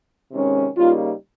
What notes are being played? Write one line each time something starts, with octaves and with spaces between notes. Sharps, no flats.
C3 D#3 G#3 C#4
C#3 G3 A#3 D#4 F4